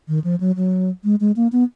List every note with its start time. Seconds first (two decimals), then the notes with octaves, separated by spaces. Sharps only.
0.08 D#3
0.24 F3
0.40 F#3
0.56 F#3
1.04 G#3
1.20 G#3
1.36 A#3
1.52 B3